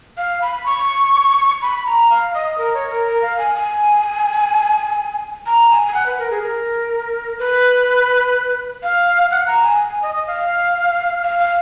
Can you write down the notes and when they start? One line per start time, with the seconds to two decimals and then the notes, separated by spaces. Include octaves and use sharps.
0.17 F5
0.42 B5
0.66 C#6
1.62 B5
1.86 A#5
2.10 F5
2.34 D#5
2.58 A#4
2.74 C#5
2.90 A#4
3.06 A#4
3.22 F5
3.38 G#5
3.55 G#5
5.46 A#5
5.70 G#5
5.86 G#5
5.94 F#5
6.06 B4
6.19 A#4
6.31 G#4
6.43 A#4
7.39 B4
8.83 F5
9.31 F#5
9.47 A#5
9.63 G#5
9.91 G#5
10.03 D#5
10.15 D#5
10.27 F5
11.23 F5
11.39 F5